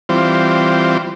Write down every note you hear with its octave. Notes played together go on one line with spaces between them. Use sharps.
E3 G3 C4 F4 C5